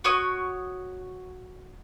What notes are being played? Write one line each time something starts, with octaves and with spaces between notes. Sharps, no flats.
F#4 C#5 C#6 D#6